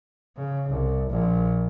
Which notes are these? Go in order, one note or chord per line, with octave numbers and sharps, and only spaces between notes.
C#3
C2
A#1